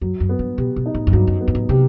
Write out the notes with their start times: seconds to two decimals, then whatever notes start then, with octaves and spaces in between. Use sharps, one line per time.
0.01 F#2 F#3
0.20 F#2
0.29 B3
0.39 G2
0.58 B2 G4
0.76 B2
0.86 D#4
0.95 A2
1.07 F#2
1.13 G2 F#3
1.27 F#2
1.41 B3
1.48 G2
1.55 A2
1.69 C3 G4